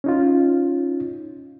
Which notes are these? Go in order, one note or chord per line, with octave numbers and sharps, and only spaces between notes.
C#4 D#4 F4